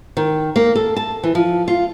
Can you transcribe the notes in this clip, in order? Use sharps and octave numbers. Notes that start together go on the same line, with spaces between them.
D#3
A#3
A4
A5
E3
F3
F4